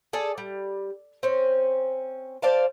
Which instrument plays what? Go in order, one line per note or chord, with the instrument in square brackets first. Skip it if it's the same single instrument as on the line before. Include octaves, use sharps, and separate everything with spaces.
[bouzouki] G#4 A4 D5
G3
C4 C#4
C5 D5 F5 A5